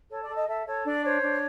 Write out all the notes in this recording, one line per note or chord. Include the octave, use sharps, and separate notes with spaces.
A4 C#5
D5
A4
D#5
A4 E5
A4 C#5
D4 D5
C5 C#5
D4